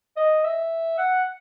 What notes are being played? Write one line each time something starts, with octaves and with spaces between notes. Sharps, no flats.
D#5
E5
F#5